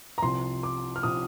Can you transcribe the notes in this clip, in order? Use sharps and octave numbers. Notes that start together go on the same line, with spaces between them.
A#5
C2 C3 F3 C6
D6
F6
C3 F3 D#6